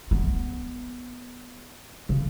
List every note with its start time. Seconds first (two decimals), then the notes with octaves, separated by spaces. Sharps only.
0.11 B3
2.09 C#3